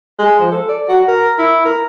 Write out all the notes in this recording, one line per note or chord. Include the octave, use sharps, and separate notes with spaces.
G#3
F3
A4
D5
F#4
A#4
E4
A#4